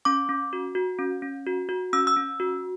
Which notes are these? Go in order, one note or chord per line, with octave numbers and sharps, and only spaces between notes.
C#4 D6
C#4
F#4
F#4
C#4
C#4
F#4
F#4
C#4 E6
E6
C#4
F#4